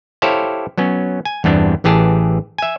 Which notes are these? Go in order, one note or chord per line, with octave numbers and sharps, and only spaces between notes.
E4 G4 A4 C5 C#5 F5
F#3 B3 C#4
G#5
E2 G2 B3 C4 D4
A1 E3 G4 G#4 A5
E5 G#5